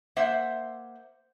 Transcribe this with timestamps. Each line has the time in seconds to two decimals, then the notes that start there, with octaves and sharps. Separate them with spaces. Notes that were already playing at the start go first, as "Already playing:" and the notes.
0.16 A#3 C5 E5 F#5